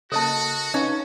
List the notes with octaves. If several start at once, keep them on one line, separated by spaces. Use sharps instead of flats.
C#3 A#3 F#4 A4 D#5 A5
C#4 D#4 B4 F5